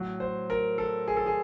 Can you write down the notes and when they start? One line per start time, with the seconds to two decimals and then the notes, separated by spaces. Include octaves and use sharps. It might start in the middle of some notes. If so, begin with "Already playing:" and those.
Already playing: A2 F#3
0.20 C5
0.50 A#4
0.78 A4
1.08 G#4
1.17 A4
1.26 G#4